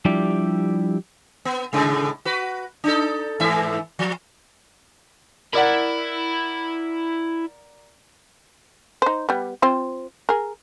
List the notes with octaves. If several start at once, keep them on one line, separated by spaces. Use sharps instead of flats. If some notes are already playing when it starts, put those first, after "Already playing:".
F3 G3 D4 E4 G4 D5
B3
A2 C#3 G#3
F#4 B4
D4 D#4 A4
G#2 E3 E5
F3
E4 A#4 D5 F#5 B5
D#4 C5
G3 B3
C4 F4 C5
G#4 A#4